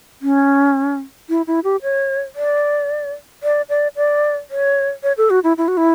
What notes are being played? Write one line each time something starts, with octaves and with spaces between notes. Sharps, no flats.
C#4
E4
E4
G4
C#5
D5
D5
D5
D5
C#5
C#5
A4
F#4
E4
E4
F#4
E4